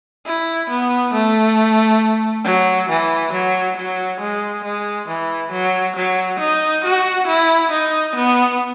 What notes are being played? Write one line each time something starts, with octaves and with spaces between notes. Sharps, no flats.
E4
B3
A3
F#3
E3
F#3
F#3
G#3
G#3
E3
F#3
F#3
D#4
F#4
E4
D#4
B3